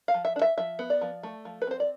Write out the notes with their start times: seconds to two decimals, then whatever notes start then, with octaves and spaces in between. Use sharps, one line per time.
0.08 F5
0.14 F3
0.25 E5
0.36 D4
0.42 E5
0.58 F3 E5
0.79 B3
0.90 D5
1.01 F3
1.23 A3
1.45 F3
1.62 B4
1.67 C4 C5
1.80 D5